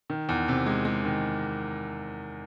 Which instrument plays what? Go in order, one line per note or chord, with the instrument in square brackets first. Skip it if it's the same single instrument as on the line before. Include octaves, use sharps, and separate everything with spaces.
[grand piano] D#3
E2
C3
G#3
G#3
D#3